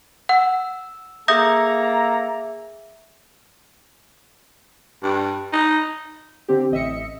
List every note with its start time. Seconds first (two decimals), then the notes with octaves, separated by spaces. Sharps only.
0.29 F#5 E6
1.28 A#3 G#4 A4 E5 A#5 D#6 G6 A#6
5.03 G2
5.53 D#4
6.48 D3 C4 G4
6.71 A1 D#5 E5 C#7